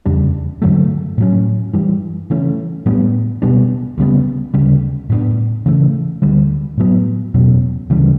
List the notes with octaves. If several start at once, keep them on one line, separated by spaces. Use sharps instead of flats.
E2 C#3 G3 D4
G2 D3 F#3 A3
A2 F#3 C#4
G2 E3 G3
C#3 E3 A3 C#4
A2 G3 B3 D4
B2 G3 B3 D4
D2 C#3 G3 B3
D2 C#3 G3
A2 E3 B3 D4
C#3 E3 A3
D2 D3 G3
A2 F#3 B3
E2 B2 F#3 C#4
D2 C#3 E3 G3